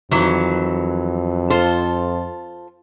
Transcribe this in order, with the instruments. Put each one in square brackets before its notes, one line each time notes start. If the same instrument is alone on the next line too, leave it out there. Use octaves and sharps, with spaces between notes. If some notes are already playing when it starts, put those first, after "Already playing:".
[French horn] F2 [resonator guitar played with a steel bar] D#3 E3 F#3
[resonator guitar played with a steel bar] F4 A4 C5